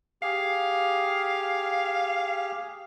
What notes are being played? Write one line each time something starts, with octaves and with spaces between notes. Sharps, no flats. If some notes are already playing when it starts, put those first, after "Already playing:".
G4 G#4 F5